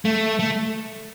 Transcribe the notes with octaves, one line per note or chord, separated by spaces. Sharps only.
A3
A3